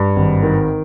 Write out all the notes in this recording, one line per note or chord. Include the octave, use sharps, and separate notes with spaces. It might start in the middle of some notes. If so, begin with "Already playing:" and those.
Already playing: G2
G#1
D#3